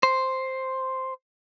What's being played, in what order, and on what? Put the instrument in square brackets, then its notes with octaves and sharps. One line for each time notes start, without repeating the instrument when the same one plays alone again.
[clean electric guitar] C5